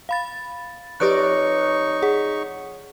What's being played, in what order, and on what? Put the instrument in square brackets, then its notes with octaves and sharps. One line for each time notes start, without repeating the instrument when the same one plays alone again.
[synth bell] F5 B5 A6
[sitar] F2 C#5 D5 [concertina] D#4 C#6 [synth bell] G4 B4 F#6
[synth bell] G#4 F#5